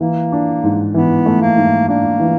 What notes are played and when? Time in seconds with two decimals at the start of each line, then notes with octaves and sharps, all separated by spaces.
0.01 E3 A#3
0.32 D4
0.63 G#2
0.94 E3 B3
1.26 A3
1.41 A#3
1.57 G#2
1.88 A#3 D4
2.20 E3